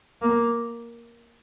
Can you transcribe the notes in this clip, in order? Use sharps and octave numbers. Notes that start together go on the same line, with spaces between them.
A#3